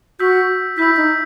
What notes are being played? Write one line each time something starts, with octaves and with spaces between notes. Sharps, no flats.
F#4 E6 G6 B6
E4 E6 G6 B6
D#4